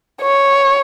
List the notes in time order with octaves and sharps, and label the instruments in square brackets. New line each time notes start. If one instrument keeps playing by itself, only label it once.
[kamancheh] C#5